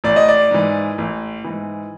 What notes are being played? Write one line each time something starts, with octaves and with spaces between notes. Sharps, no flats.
A1 D5
D#5
D5
G#2 E3
A1
G#2 E3